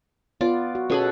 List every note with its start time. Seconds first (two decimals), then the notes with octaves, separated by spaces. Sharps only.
0.41 B3 F4 D5
0.75 F#4
0.90 B2 B3 C#4 G#4 A4 B5